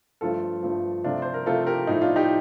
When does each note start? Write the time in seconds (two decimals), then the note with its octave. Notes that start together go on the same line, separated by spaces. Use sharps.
0.21 G2 F3 A3 F4 A4
0.63 G2 F3 A3
1.04 C3 F3 A3 D4 F4
1.22 C5
1.34 A#4
1.46 C3 F3 A3 F4 A4
1.67 G4 A#4
1.87 A2 F3 A3 D#4
2.02 D4 F4
2.16 D#4 G4